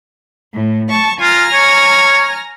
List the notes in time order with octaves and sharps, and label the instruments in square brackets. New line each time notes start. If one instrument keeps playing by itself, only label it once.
[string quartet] A2
A5 C#6
[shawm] F4 [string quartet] G#5 A#5 F6
[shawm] C#5